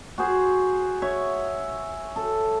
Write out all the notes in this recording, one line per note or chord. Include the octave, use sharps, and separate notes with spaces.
F#4 G#4 C5
C#5 E5
A4